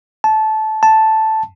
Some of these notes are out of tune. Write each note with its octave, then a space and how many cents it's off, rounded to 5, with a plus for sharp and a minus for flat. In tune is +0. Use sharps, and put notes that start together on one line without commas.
A5 -15
A5 +0